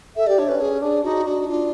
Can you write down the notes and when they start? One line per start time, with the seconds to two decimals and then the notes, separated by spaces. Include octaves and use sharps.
0.16 A4 E5
0.27 G4 D5
0.38 D4 C#5
0.49 C#4 B4
0.60 C#4 G#4
0.82 D4 G#4
1.03 D#4 F#4
1.26 D4 F#4
1.47 D4 F4